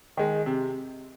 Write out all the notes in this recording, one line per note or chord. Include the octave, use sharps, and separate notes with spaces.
D#3 G#3
C3